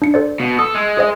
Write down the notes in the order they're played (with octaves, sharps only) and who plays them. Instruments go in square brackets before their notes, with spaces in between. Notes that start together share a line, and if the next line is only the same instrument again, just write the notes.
[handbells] D4 C#7
A4 C5 D5
[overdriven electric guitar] B2
[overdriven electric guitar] A4 [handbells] D#6
[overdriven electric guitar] G#3
[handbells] G#4 C5 D#5